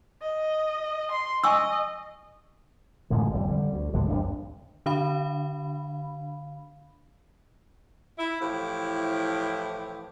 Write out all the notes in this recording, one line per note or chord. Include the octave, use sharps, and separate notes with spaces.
D#5
C6
D#5 G#5 C#6 E6
A1 A2 D3 G#3
G1 F2 C3 G3
D3 G3
D2
D#2 A2 D3 G#3
G#1 G2 D4
D3 D4 F5 B5
E4
A2 E3 F3 E4 G4